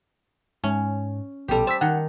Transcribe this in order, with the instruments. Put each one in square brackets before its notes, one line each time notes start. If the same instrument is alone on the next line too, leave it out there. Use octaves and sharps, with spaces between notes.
[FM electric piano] G#2 [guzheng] C#4
[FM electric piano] A#1 B2 A4 [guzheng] G3 G4
[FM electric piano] C5 E6 B6 [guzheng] A5
[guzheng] D#3 [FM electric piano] F#5